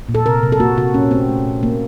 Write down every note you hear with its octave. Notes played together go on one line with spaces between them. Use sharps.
A#2
A4
C3 A#4
C3
A4
A#3 F#4
C3 F#4
A#2 C#4
A3 C4
A3
A#2
A3 A#3